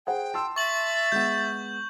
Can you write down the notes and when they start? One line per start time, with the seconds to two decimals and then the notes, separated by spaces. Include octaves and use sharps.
0.07 G#4 C5 F#5 G5
0.34 A5 C6 E6
0.56 E5 C#6 A6 F#7
1.12 G#3 B3 G6